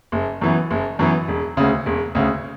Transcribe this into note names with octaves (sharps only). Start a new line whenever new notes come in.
F#1
F#2 E3 B3
F#1
F#2 E3 B3
E1
D2 C#3
E1
D2 C#3